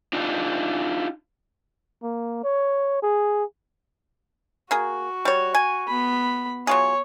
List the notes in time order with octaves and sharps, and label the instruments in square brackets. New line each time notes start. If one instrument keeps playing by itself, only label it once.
[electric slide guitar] D4 D#4 F4
[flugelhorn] A#3
C#5
G#4
[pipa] A#3 G#4 [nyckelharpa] F#4
[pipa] G3 C#5
G#5
[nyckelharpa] B3 B5
[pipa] F#3 F4 G#4 [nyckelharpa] C#5